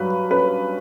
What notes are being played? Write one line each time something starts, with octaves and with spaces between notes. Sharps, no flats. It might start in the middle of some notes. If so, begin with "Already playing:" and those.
Already playing: G2 F#3 B4
C#4 B4